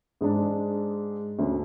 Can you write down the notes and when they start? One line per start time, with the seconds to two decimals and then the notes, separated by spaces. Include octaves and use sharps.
0.21 G#2 G#3 D4
1.39 D2 D3 A3 C#4